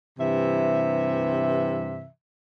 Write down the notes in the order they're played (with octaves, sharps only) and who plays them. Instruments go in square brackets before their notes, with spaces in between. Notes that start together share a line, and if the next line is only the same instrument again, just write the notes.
[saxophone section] G2 C3 E3 E5